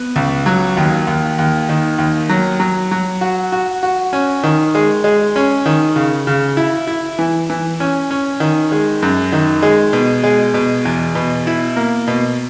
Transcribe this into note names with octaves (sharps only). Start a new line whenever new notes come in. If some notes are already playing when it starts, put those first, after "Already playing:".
Already playing: B3
C#2
F#3
D#2
D#2
D#2
D#3
D#2
F#3
F#3
F#3
F#4
F#4
F#4
C#4
D#3
G#3
G#3
C#4
D#3
C#3
C#3
E4
E4
E3
E3
C#4
C#4
D#3
G#3
F#2
D#3
G#3
B2
G#3
B2
E2
B2
E4
A#3
B2